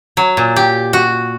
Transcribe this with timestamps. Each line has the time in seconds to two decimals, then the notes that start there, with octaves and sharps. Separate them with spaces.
0.17 F#3
0.37 A#2
0.56 G4
0.93 F#4